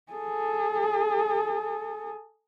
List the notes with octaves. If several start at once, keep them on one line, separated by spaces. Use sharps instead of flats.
G#4 A4